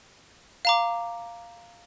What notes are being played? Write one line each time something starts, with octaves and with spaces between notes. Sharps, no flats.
F5 A#5 D6